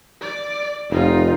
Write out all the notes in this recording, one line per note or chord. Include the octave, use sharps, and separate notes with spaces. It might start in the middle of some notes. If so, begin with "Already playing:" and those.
D5
F1 D#4 F4